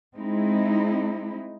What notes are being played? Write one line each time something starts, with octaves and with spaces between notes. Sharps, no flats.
G#3 C4 D#4 E4